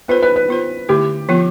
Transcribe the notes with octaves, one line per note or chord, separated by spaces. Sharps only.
B3 F4 A4 B4 C5
B4
B4
B3 F4 C5
D3 A3 E4 G4
F3 B3 F4